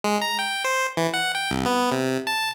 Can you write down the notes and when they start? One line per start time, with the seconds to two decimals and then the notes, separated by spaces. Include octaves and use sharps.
0.04 G#3
0.21 A#5
0.39 G5
0.64 C5
0.97 E3
1.14 F#5
1.35 G5
1.51 C2
1.66 B3
1.92 C3
2.27 A5